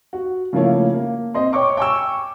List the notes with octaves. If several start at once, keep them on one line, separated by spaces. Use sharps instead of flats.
F#4
C#3 F3 A3 A#3 C#4 E4
A#3
C4 D#5 C6
C#5 G5 C#6 D6
G5 G#5 C#6 E6